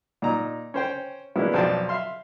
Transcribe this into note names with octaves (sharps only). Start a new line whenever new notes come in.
A#2 D#4 A#5
C#4 C5 G5
G#3 A#3 B3 C#4 D4 E4
B1 F2 C5 D5 G5 A5
E5 F5 C6